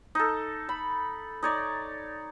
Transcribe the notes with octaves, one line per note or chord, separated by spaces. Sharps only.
D#4 A4
B5
D#4 C#5 D5